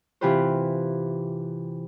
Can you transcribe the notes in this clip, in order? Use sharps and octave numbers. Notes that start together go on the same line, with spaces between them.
C3 E3 F4 G4 B4 C5